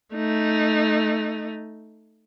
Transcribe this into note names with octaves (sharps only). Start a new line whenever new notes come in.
A3 D#4